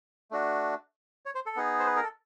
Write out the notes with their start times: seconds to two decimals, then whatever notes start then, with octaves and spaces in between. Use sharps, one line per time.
0.31 A3 D4 F#4
1.26 C#5
1.35 C5
1.46 A4
1.56 B3 D#4 G#4
1.79 C5
1.87 B4
1.96 A#4
2.03 A4